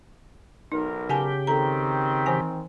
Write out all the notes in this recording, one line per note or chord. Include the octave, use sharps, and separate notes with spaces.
B1 D#4 A#4
C#3 G4 F#5 G#5 A5
D#3 C4 A4 A#5
E3 C5 G#5